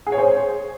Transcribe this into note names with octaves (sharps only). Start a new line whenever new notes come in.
G#4
C#5
C5